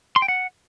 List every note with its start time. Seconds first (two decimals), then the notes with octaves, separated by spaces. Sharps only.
0.16 C6
0.22 G5
0.28 F#5